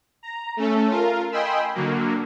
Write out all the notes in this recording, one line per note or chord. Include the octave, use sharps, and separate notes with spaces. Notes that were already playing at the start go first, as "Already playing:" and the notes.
A#5
A3 C#4 A4
F4 A#4
D#5 G5 G#5 B5 C6 E6
D3 F#3 A#3